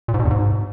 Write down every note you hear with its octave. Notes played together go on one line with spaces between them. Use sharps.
A#2
G#2
B2
E2
G#2